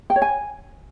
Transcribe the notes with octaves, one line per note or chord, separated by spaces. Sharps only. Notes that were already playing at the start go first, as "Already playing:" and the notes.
G5
C#5
G#5